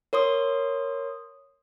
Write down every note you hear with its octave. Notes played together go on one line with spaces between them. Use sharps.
A#4 C#5 C6 D#6